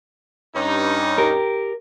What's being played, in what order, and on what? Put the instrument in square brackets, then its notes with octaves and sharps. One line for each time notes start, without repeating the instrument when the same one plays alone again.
[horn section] G2 C#4 D#4
[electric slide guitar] G4 A#4